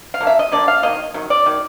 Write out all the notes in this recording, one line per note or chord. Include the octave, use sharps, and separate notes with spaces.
F5
D3 F#3 A#3
E5
D#5
D3 F#3 A#3 D5
F5
D#3 F#3 A#3 D#5
D#3 F#3
D5
D#3 F#3